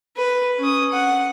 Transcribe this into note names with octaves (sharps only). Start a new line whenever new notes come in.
B4
C#4 D#6
F#5